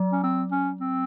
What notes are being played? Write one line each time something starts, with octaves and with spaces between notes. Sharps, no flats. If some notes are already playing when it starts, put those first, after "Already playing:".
Already playing: F#3
C#4
C4
C#4
C4